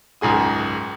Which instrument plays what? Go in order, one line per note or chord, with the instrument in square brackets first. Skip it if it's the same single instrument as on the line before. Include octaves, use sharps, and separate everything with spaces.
[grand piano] F#1 C#2 G#2 G#4 D#6